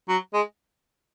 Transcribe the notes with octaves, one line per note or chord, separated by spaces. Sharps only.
F#3
G#3